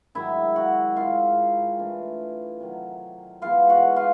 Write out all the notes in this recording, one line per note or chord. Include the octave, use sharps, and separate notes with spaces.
G#2 D#3 F#3 E4 E5
F#4 F#5
C3 D#3 G#3 F4 F5
E3 A3 D4
C3 D#3 F#3
E3 G#3 B3 F4 F5
F#4 F#5
F4 F5